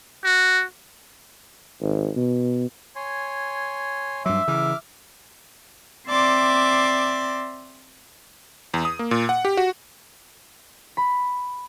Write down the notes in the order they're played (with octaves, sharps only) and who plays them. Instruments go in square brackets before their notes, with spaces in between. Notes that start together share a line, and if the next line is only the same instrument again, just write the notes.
[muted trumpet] F#4
[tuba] G#1
B2
[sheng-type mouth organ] C#5 G#5 C6
[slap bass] G2 F#3 [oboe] E5 [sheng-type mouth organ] C6 D6
[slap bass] C#3 E3 [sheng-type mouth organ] D6 F6
[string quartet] C4 D5 E5 C6 D6
[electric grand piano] E2
D#6
A#3
A#2
F#5
G4
F#4
[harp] B5